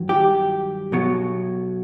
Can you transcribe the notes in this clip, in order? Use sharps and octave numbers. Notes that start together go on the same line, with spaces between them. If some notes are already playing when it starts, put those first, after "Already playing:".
Already playing: G2 D#3 F#3
G4
B1 B2 F#3